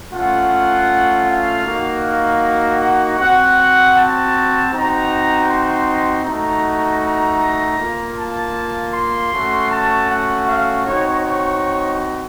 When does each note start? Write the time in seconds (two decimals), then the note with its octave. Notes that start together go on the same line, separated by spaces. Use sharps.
0.11 A3 C#4 F4 F#5
1.26 F5
1.65 A#3 D#4 F#4
2.03 F5
2.80 F#5
3.18 C4 F#4 F#5
3.94 A5
4.72 C4 D#4 F#4 A#5
5.47 C6
6.24 A3 D#4 F#4 A#5
7.01 A#5
7.78 A#3 F4
8.17 A5
8.92 C6
9.32 A3 C#4 F#4
9.70 A5
10.08 F#5
10.46 F5
10.85 C4 D#4 F#4 C#5
11.23 C#5